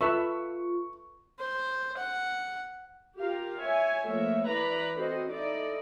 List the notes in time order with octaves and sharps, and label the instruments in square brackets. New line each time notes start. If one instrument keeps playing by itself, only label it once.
[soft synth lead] F4 [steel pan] A4 B4 E5 [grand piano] C#6
[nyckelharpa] C5
F#5
[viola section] F4 G4 A#4 F5
C#5 E5 G#5
F3 A3 A#3 C#5 E5
E3 B4 D5 A#5 B5
C4 F#4 A4 C5 D#5
D#4 E4 A4 D5 D#5